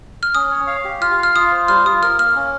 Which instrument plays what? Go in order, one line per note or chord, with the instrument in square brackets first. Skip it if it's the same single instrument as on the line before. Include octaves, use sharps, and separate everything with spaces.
[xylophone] F6
[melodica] C#4 [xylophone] D#6
[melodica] C#5
F5
G4
[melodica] F4 [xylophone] F6
[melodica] F5
[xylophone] F6
[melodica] F4 [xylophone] D#6
[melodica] C5
[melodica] G3 [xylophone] F6
[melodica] F4 [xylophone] D#6
[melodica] A#4 [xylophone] F6
[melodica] A#3 [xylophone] F6
[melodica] C#4